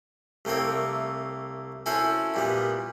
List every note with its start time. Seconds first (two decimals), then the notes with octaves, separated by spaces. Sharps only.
0.45 C2 A3 A#3 C4 C#5
1.86 C#4 E4 F#4 A4 C5 C#5
2.34 A#2 G3 B3